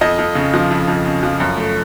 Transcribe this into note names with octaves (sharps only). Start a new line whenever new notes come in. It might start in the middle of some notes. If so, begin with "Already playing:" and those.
F2 D#5
F2
C#3
F3
F2
F2
C#3
F3
F#2
A3